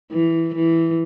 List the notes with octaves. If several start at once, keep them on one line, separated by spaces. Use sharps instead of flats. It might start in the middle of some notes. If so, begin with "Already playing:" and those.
E3
E3